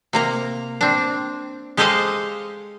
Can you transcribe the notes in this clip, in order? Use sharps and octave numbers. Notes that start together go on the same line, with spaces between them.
C3 A#3 A#5
C4 D4
G#3 G4 A4 C5 D#5 F5